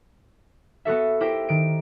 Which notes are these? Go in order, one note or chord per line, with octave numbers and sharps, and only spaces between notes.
B3 F#4 A4 E5
E4 G4 A#4 C5 G5
D#3 D7